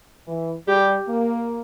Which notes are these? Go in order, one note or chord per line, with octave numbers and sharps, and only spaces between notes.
E3
G3 G4
A#3